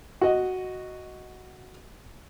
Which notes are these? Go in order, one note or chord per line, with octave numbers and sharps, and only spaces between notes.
F#4 D#5